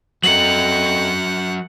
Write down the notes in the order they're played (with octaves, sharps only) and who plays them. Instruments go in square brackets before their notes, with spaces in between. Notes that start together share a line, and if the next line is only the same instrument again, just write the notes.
[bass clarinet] F2 [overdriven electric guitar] F#3 A#4 [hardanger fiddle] F#5 [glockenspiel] F#7